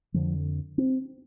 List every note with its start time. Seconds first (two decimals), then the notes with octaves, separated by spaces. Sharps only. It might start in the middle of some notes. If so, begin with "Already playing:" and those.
0.14 F2 D3 F3
0.78 C4